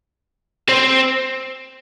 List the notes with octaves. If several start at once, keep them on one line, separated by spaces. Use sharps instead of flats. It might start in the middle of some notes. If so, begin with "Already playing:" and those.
C4